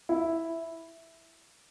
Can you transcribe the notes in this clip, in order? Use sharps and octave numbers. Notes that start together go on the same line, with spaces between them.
E4